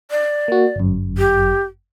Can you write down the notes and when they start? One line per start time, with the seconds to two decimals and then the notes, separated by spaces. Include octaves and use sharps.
0.11 D5
0.48 A#3 F#4
0.76 G1 F#2
1.18 G4